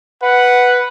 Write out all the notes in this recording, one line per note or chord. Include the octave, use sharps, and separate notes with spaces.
B4 F#5